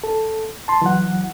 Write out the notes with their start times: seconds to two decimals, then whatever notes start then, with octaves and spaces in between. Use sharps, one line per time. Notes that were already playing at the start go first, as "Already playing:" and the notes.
0.04 A4
0.68 A5 C6
0.82 E3 F#3 F#5